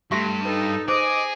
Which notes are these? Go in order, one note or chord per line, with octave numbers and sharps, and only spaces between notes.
G2 A3 G4 E5 C6
D#4 A4 B4
G#4 C5 D#5 D6